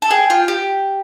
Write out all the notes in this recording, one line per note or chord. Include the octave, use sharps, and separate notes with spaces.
A4
G#4 G5
F4
G4